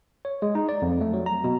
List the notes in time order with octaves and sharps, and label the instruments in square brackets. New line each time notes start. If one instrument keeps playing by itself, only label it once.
[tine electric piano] C#5
G#3
D#4
D5
F2
A3
F#3
A#5
B2